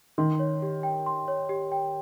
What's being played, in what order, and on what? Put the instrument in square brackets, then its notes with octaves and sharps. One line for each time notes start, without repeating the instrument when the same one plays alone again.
[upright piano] D#3 [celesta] C6
[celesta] C#5
G4
G5
C6
C#5
G4
G5